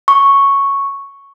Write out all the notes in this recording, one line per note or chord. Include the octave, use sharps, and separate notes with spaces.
C#6